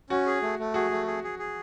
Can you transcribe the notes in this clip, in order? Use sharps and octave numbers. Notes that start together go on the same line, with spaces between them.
C#4 F#4
G#4
A3
A3
F#4 G#4
A3
G#4
G#4
G#4